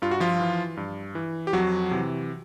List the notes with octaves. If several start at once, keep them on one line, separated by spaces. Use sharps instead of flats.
G2 F4
F#4
F3 F4
E3
G2
E3
G4
F2 F#3 F#4
C3 E3